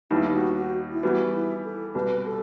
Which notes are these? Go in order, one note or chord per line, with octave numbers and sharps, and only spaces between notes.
D#2 D#3 G3 B3 D#4 E4
F#4
F#4
E4
E3 G3 B3 F#4
E4
A4
C2 B2 G3 B4
A4